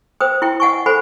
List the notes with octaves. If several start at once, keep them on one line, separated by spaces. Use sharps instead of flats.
B4 C5 G5 D#6
E4 G5
D#5 F#5 G#5 C#6
A4 C5 F#5 G#5 B5